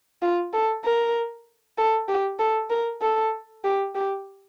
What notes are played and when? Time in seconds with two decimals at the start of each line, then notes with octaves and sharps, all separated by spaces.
0.22 F4
0.53 A4
0.84 A#4
1.78 A4
2.08 G4
2.39 A4
2.70 A#4
3.02 A4
3.64 G4
3.95 G4